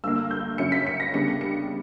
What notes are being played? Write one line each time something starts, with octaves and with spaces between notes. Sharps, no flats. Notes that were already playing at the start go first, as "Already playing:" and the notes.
G2 D3 A#3 E6
G6
F#2 C#3 F#3 C#4 C#7
B6
C#7
A#6
C#3 G3 B3 D4 C#7
C#7